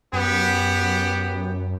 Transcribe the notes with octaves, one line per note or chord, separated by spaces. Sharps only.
F#2 B3 G4